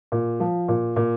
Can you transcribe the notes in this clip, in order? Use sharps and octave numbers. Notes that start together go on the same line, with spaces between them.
A#2
F3
A#2
A#2